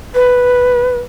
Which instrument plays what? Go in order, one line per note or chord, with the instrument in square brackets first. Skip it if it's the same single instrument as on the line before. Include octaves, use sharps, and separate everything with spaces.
[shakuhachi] B4